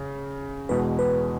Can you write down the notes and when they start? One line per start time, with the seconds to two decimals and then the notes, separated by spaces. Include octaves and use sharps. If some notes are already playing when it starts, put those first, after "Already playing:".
Already playing: C#3
0.69 E2 B2 G#3 B4
0.99 B4